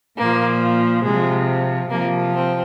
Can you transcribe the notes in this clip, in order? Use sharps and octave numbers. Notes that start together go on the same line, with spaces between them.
A#2 F3 A#3
C3 F3 G#3
C3 F3 A#3
C4